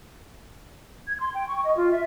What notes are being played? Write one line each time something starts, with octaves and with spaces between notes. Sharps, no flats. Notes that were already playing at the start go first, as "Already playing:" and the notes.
G#6
C6
G5
C#6
D#5
F4
E5